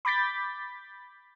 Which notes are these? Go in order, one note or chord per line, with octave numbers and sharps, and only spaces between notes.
B5 D6 G6 A6 B6